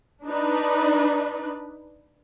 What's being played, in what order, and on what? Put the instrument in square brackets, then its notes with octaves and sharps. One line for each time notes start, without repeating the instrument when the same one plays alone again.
[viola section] D4 D#4 B4